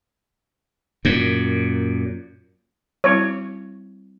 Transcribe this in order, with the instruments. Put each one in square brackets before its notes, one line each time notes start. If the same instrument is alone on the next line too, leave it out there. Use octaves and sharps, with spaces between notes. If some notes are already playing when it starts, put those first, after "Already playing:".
[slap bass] F#2 A#2
[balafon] G3 C4 E4 [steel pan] C#5